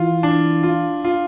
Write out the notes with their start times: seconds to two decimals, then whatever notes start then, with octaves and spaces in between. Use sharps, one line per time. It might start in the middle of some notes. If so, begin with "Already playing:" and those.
Already playing: E3 F4
0.23 D4
0.63 F4
1.04 F4